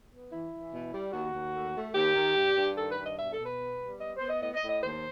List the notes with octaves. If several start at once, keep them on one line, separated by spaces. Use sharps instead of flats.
B3
E3 E4
E3
B2
G3
D#2 F#4
D#2
A3
A3
D#2 G4
D#3
G2
G2
D#3 A4
B4
G2
D#5
B2 E5
A4
B2
B4
B3
G3
B3 D#5
B3 C5
D#5
A2 D#5
D#5
A2
D#5
D#2 C5